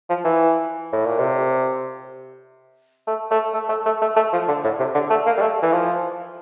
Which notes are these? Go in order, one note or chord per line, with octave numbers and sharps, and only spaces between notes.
F3
E3
A2
A#2
C3
A3
A3
A3
A3
A3
A3
A3
F3
D3
A2
C3
D3
A3
A#3
G3
A3
E3
F3